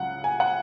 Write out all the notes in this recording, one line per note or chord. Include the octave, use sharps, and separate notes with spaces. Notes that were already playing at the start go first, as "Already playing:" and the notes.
Already playing: C#2 C#3 F#3 F#5
G#5
F#5